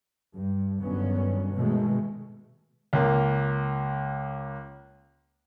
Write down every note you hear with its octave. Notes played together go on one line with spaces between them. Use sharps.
G2
G1 G2 D#3 F#3 B3 C#4
B2 D#3 G#3 A3
C#2 A#3